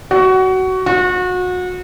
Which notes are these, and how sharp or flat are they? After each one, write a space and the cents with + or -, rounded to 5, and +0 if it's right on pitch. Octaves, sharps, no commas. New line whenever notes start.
F#4 +20
F#4 -30